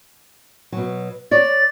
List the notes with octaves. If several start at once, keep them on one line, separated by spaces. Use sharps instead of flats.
B2 F#3
C#5 D5 A6